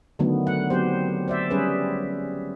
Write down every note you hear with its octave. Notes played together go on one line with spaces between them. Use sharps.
D3 D#3 F#3 A3 B3
F#5
F#3 B3 C4 G4 C5
C5 D5 E5
G3 C#4 G#4 B4